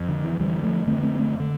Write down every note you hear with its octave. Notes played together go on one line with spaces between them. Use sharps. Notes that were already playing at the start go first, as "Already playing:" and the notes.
Already playing: F2
D3
E3
F2 D3 E3 G3
F3 A3
F2 D3 A3 C4
A3 C4
A3 C4
D3